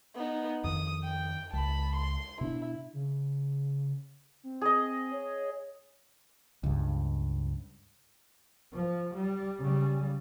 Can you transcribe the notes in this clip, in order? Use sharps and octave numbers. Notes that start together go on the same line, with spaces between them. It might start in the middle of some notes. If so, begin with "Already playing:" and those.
B3 D#4
F2 D#3 D#6
G5
C#2 A5 B5
C6
B2 D4 E4
C#3
C4
G#4 D#5
C#5
C#2 G2
F3
G3
C#3 G3